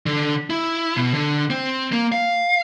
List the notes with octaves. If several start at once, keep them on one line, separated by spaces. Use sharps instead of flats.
D3
E4
B2
D3
C4
A#3
F5